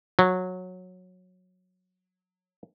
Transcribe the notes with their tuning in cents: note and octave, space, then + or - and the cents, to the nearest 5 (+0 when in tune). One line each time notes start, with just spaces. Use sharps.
F#3 -15